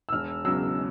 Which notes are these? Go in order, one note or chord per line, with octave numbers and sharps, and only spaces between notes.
E6
E1 F6
E2 C#3 F#3 E6